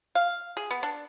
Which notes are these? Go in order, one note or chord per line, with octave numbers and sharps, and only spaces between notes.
F5
G#4
B3
D4